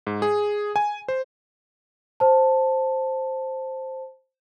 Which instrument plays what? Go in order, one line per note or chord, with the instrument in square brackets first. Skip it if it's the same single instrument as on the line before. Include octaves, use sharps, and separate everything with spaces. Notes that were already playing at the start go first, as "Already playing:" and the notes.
[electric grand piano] G#2
G#4
G#5
C5
[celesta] C5 A5